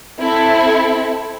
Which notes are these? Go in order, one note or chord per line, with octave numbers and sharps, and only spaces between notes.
C4 E4 A4